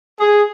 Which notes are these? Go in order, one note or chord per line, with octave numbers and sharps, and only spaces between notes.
G#4